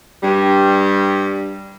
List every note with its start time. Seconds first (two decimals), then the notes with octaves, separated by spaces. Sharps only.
0.23 G2 G3